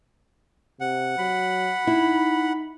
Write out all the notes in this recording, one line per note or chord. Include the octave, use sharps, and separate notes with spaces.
C3 F#5
F#3 B5
D#4 E4